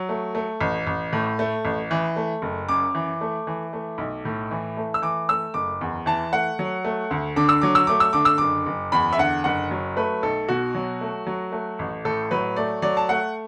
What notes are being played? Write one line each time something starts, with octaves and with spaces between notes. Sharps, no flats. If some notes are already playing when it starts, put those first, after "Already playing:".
Already playing: F#3
A3
A3
A1
A1
A2
A3
A1
E3
A3
F#1
F#2 D6
E3
A3
E3
A3
B1
A2
E3
A3
E6
E3 D6
A3 E6
F#1 D6
E2
E3 A5
A3 F#5
F#3
A3
D2
D3 D6
E6
F#3 D6
E6
A3 D6
E6
D3 D6
E6
F#1 D6
F#1
E2 B5
E5
D3 F#5
F#1 F#5
F#3
A3 B4
B1 A4
B2 F#4
F#3
A3
F#3
A3
A1
A2 A4
F#3 B4
A3 D5
F#3 D5
A5
A3 F#5